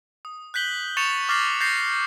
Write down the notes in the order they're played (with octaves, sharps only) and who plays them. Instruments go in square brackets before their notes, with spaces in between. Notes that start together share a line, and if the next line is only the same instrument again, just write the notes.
[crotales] D#6
F#6 G6 B6 F#7 G7
C#6 A6 C#7 E7 F7 G7
D6 F6 A6 A#6 C7 F#7
G6 A6 A#6 C7 C#7